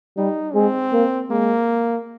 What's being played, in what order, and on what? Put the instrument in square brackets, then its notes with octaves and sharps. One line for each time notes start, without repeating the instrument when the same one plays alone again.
[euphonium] G3 [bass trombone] D#4
[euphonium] G#3 [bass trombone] C4
[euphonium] A#3
[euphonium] G#3 [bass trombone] A#3